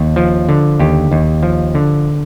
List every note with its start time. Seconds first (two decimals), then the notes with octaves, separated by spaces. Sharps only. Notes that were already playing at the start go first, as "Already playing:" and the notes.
Already playing: D#2
0.16 F3
0.49 D3
0.80 D#2 G4
1.12 D#2
1.43 F3
1.75 D3